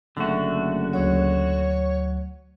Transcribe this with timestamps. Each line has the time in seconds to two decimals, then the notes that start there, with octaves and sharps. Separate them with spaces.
0.17 F#1 D3 A3 F#4
0.93 D2 F#3 C#5 F#5